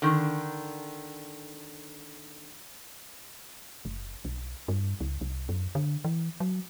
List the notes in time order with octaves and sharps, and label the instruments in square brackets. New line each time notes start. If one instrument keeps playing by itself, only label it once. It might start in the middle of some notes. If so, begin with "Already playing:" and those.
[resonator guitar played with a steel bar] D3 D#3
[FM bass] F#1
B1
G2
C#2
C2
F#2
D3
E3
F#3